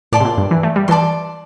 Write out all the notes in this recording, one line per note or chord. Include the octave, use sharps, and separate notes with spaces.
A2 D5 A5 C6
C3
A#2
G2
E3
A3
G3
E3 D5 A5 C6